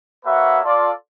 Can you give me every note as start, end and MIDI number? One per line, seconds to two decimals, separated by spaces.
0.25 0.58 58
0.25 0.58 66
0.25 0.58 71
0.25 0.58 73
0.25 0.58 76
0.25 0.58 78
0.63 0.91 65
0.63 0.91 69
0.63 0.91 74